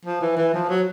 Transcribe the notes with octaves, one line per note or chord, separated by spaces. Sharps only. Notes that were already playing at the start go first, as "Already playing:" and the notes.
F3
E3
E3
F3
F#3